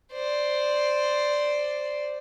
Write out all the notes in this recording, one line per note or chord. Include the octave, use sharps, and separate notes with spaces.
C5 D5